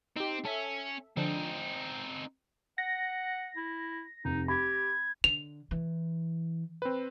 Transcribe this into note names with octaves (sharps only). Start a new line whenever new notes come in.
C4 D#4 G4
C#4 A4 E5
D3 F3 C4 D4 D#4
F#5 A#6
E4
F1 D#4
G4 B5 G#6
D3 F7
E3
C4 B4